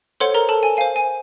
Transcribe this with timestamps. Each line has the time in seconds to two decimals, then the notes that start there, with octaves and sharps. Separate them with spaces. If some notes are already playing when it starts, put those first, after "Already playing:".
0.20 A4 C5 C#5 F#5 C6
0.34 A#4 A#5
0.49 A4 A5
0.63 G#5
0.77 C5 F5 G#5
0.96 G#5